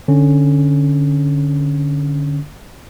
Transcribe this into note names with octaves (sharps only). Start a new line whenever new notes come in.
D3 C#4